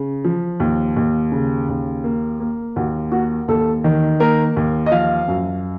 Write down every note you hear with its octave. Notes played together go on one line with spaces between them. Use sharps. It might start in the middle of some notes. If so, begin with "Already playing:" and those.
Already playing: C#3
F3
D#2
D#2
C#3
D#2
A#3
A#3
D#2 F#4
A#3 F#4
D#2 A4
D#3
A#3 A#4
D#2
D#5
F3 F5
F#2